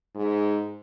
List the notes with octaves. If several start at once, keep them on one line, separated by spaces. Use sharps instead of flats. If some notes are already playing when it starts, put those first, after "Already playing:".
G#2